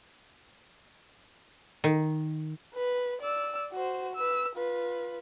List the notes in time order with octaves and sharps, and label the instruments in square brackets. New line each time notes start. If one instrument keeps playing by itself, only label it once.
[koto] D#3
[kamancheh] B4
D5 E6
F#4 C5
B4 E6
F4 B4